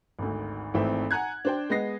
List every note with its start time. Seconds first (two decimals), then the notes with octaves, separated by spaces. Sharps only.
0.19 G#1 D2
0.74 G#1 E3 A3 C4 E5
1.11 F#5 G#5 A#5 F#6 G#6
1.45 D4 C5 G5
1.70 G#3 B3 D#5 A#6 C7